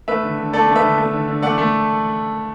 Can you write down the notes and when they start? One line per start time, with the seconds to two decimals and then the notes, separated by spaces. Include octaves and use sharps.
0.08 A3 B4 E5
0.23 D3
0.38 D3
0.53 A3 A4 D5
0.67 A3
0.76 B4 E5
0.83 D3
0.98 A3
1.13 D3
1.27 D3
1.42 A3 D5 F#5
1.58 A3